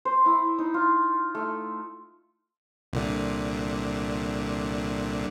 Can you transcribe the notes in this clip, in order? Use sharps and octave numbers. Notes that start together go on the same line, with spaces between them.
C5
E4
D#4
F4
A3
C2 A#2 D3